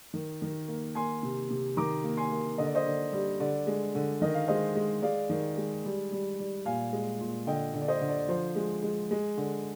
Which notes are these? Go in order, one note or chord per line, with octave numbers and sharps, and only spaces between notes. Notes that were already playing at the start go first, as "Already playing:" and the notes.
D#3
D#3
A#3
A#3 G#5 C6
C3
C3
D#3 A#5 D6
A#3
G#5 C6
A#3
D3 D#5
D5
C5 D#5
D3
G3
D3 D5
G#3
D3
D#3 D#5
F5
G#3 C5 D#5
G#3
G#3 D5 F5
D#3
G#3
G3
G3
G3
A#2 F5 G#5
G#3
A#2
D3 D#5 G5
D3
D5
C5 D#5
D3
D5
F3 C5
G#3
G#3
G#3
D3